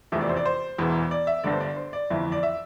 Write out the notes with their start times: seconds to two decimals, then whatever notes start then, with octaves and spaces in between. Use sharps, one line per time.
0.12 F1 E2 C3 F3 A3 E5
0.21 D5
0.29 C5
0.37 D5
0.46 C5
0.78 E1 E2 E3
1.11 D5
1.27 E5
1.44 G1 G2 D3 D5
1.52 C5
1.60 D5
1.76 C5
1.93 D5
2.10 G1 F2 E3 E5
2.32 D5
2.43 E5